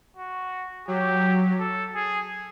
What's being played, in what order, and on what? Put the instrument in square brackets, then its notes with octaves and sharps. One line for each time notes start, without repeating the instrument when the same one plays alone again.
[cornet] F#4
[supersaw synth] F#3 [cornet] G4
[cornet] A4
G#4